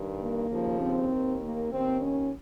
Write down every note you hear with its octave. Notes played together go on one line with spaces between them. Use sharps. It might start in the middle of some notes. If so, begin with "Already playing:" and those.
Already playing: G2 D#3
A#3
D#2 C#3 F3
C4
D#2 D#3
A#3
D#2 D#3 C4
C#4